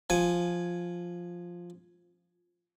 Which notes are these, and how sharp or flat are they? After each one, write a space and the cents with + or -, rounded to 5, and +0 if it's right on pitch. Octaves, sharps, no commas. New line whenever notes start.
F3 +0 G#5 +0